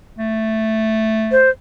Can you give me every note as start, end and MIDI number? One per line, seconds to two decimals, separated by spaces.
0.18 1.51 57
1.31 1.50 72